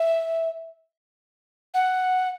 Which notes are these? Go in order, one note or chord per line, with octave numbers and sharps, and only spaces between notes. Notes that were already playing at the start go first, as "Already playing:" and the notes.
Already playing: E5
F#5